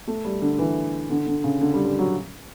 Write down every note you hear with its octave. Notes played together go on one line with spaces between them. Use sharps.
A3
G3
D3
E3
D3
D3
C#3
D3
G3
G3
F#3